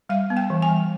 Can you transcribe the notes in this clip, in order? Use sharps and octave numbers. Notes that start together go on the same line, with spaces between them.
G3 F5
B3
G5
E3
G#5
G3